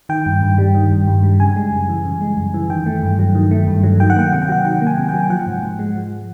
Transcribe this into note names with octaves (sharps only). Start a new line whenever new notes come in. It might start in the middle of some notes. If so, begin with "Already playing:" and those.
D#3 G5
G2
G2
G3
D#3
G2
G2
G3
C#3 G#5
G#3
F#2
E3
C#3
G#3
F#2
E3
D#3 G5
A3
G2
F#3
D#3
A3
G2
F#3
D#3 G5
F#5
A#3 G5
C3 F#5
G5
F#3 F#5
D#3 G5
A#3
G#5
C3
G5
F#3
G5
F3 F#5
G#2
G#2
G#3
F3